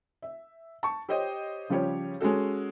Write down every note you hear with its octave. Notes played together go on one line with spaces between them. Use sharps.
E5
A5 C#6
G4 C5 C#5 D#5 G5
C#3 F3 G3 G4 C#5
G#3 C#4 F#4 A4